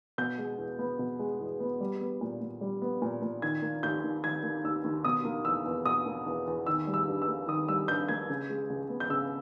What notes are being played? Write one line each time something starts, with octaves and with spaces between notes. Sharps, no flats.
B2 G6
G#3
E2
B3
B2
G#3
E2
B3
G3
B3
A#2
A#2
G3
B3
A#2
A#2
D#3 G#6
A#3
D#2 G6
D#2
D#3 G#6
A#3
D#2 E6
D#2
B2 D#6
A#3
E2 E6
E2
B2 D#6
A#3
E2
E2
D#3 E6
G3
E6
G2
E6
A#3
D#3 D#6
G3 E6
G2 G6
A#3 G#6
C#3
G#3
C#2
B3
G6
C#3 E6